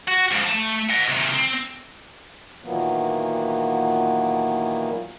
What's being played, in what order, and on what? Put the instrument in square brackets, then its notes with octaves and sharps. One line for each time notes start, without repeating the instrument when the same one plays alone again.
[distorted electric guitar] F#4
G#2 F3
A3 A5
D#5 F#5
C3 D#3
C4
[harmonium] A#2 D#3 E3 F#3 A#3 B3